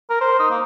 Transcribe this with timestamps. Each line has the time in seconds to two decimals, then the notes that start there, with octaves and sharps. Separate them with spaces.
0.10 A#4
0.21 C5
0.39 D#4
0.50 A#3